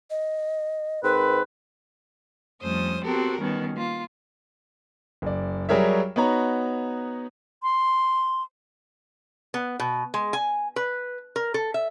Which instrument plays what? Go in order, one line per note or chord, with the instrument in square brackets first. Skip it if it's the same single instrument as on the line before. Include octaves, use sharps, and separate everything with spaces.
[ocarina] D#5
[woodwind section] G#2 C4 B4 [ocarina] A#4
[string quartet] F2 G3 A3 C#4 C5 D#6
B3 C4 F#4 G4 A4 A#4
B2 D#3 G3 B3 C#4
A#3 F4
[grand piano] F#1 D5
F#3 G3 G#4 A#4 C#5 E5
B3 D#4 F#4 B4 C#5 A#5
[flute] C6
[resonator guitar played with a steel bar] B3
B2
G#3
G#5
B4
A#4
A4
E5